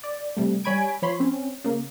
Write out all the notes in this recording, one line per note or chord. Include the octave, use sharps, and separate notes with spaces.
D5
C3 G3 A3
G3 C#5 G#5 B5 G#6 D7
F3 C#5 B5 C6
C4 C#4
C#3 A#3